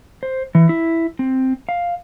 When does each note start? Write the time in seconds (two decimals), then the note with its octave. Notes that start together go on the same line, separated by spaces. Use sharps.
0.23 C5
0.55 E3
0.69 E4
1.19 C4
1.69 F5